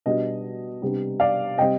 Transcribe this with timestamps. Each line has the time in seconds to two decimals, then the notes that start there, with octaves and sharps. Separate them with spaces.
0.06 B2 G3 B3 D4 D#5
0.82 C3 G3 B3 D4
1.20 D5 F5
1.58 C3 G3 C4 D#5 G5